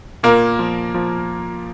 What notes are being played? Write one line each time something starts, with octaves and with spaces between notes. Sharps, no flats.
A#2 A#3 A#4
F3
F3